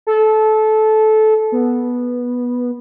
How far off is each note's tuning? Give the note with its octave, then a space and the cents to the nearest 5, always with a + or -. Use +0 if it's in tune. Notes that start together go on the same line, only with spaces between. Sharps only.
A4 -20
B3 -10